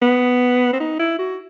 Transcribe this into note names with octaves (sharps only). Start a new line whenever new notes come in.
B3
C4
D#4
E4
F#4